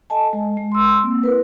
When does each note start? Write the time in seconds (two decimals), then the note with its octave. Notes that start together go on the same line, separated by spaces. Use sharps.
0.10 A4 D#5 G#5 A5
0.33 G#3 D#5
0.57 G#3
0.72 C6 E6
1.03 A#3 C4
1.23 E4 A#4 B4